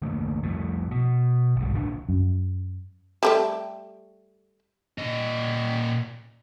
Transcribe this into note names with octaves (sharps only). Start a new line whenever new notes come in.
D#3 A3 A#3
F2 A2
B2
G1 C2 G#2
D1 A#1 D#2 D4
F#2
G3 A3 G5
A#2 D#5